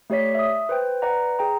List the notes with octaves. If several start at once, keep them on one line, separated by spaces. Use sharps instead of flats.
A3 G4 C#5 D5 B6
E5 D#6
B4 C5 G5
B4 D5 F#5 A#5
G#4 G5 A#5